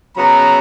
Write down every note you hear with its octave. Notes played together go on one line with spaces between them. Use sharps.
C#3 F#3 B3 A#5